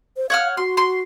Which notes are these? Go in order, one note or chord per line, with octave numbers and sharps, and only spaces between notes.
C5
C#5 F5 F#5 F6
F#4 C6
C6